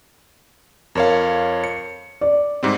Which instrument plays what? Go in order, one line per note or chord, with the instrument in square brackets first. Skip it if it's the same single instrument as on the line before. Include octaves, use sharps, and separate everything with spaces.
[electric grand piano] F2 C#5 F5 [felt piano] A#4
[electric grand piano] C#7
[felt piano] D5
[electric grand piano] G#2 G3 C4